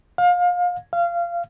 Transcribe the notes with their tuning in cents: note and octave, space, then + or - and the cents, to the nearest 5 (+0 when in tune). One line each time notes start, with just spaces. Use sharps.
F5 +30
F5 -20